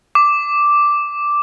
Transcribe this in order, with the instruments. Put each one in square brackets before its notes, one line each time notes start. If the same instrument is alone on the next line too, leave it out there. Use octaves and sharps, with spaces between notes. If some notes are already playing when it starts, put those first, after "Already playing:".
[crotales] D6